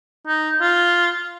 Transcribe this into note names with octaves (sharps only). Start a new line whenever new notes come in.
D#4
F4